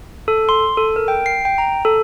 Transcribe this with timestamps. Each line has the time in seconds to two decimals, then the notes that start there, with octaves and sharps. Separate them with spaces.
0.28 A4
0.49 C6
0.77 A4
0.96 A#4
1.08 G5
1.26 C7
1.45 G5
1.58 A#5
1.85 A4